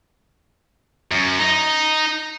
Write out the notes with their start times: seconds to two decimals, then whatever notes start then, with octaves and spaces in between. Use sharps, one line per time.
1.12 F#2
1.39 D#4